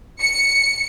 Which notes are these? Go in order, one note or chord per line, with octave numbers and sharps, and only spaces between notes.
C#7